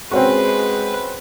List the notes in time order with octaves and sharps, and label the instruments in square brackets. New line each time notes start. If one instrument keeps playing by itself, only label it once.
[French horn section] G#3 [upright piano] C4 C#4 F#4 [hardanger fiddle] B4